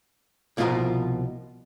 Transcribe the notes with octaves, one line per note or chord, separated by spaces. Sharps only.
C2 B2 F3 F4 A#4 C6